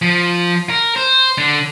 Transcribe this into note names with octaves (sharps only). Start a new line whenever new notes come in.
F3
A#4
C5
D3